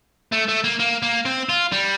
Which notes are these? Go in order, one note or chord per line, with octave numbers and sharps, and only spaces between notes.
A3
A3
A#3
A#3
A#3
C4
F4
G3